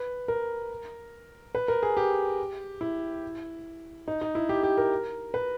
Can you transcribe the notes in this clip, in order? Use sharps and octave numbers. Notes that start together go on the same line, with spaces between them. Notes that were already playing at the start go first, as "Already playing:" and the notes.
Already playing: B4
A#4
B4
A#4
G#4
G4
E4
D#4
D#4
E4
G4
G4
A#4
B4